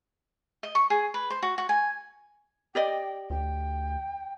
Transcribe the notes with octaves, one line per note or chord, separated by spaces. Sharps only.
D#5
C#6
G#4
B4
C5
F#4
F#4
G#5
G4 D5 D#5 G5
D2 G5